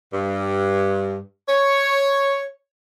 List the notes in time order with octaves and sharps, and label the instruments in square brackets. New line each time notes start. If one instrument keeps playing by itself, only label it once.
[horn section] G2
C#5